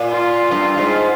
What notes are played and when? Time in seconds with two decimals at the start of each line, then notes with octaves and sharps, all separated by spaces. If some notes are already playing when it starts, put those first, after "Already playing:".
Already playing: A#2
0.10 F4
0.51 G2
0.78 G#2